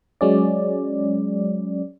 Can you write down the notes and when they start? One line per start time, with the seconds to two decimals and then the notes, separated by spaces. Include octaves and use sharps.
0.21 F#3 G#3 C#4 D5